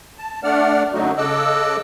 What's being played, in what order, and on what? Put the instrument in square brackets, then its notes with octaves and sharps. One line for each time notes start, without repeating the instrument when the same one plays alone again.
[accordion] A5
A3 D4 D5 F#5 F6
F#2 D3 F#3 A3 D#4 F#4
C#3 A4 D#5 D6 E6 F#6